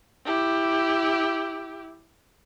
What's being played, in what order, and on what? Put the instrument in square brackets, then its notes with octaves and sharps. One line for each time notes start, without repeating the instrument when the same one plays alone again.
[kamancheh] E4 G4